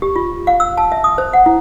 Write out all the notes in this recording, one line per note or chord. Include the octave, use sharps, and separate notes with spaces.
G4
F4
F5
E6
A5
E5
D#6
C5
F#5
E4